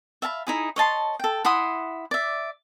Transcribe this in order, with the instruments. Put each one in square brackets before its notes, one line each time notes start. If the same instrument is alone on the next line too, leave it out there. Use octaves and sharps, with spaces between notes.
[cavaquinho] E5 F5 A5 B5
D#4 E4 G#4
C#5 D#5 A5 C6
A4 G5
E4 F#5 C6 D#6
D5 E5